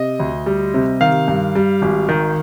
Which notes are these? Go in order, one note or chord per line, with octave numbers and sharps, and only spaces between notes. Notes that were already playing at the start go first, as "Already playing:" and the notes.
Already playing: C3 D#5
D2
G3
C3
D#3 F5
G2
G3
G#1
D#3